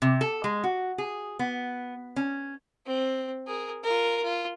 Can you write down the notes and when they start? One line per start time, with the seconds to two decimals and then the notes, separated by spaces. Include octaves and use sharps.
0.02 C3
0.21 A4
0.44 G#3
0.64 F#4
0.98 G#4
1.39 B3
2.16 C#4
2.86 C4
3.47 G#4 A#4
3.84 F4 A#4
4.23 F4